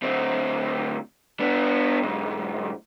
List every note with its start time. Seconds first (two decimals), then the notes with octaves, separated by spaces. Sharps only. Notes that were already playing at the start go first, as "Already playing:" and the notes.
0.02 D2 C4
1.40 B3 D4
2.02 B1 G#2